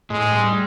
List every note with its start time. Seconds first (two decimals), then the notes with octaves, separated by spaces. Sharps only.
0.10 A2 G#3
0.32 G3